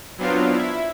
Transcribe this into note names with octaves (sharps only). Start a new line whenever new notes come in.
F#3 B3 C4 D4 F4 F5
E4